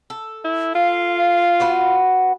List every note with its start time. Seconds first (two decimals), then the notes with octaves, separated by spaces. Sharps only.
0.10 A4
0.45 E4
0.75 F4 F5
1.60 B3 F#4 B4